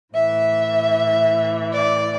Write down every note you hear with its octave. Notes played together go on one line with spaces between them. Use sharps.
A2 E3 E5
D5